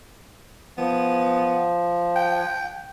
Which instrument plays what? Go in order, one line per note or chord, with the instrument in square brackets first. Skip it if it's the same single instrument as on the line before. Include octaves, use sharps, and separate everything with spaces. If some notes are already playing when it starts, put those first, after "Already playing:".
[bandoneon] F3 [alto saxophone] B3
[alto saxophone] G5